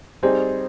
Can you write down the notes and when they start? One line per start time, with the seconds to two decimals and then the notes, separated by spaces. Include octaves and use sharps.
0.23 G3 C4 D#4 G#4 C5